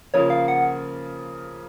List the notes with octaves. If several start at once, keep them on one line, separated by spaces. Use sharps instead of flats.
C#3 F3 A#3 F4 C#5
F5
F#5